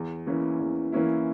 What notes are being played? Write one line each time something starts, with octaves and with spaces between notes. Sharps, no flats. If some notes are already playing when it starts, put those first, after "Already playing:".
Already playing: E2
E3 A#3 C#4 E4
E2
E3 A#3 C#4 E4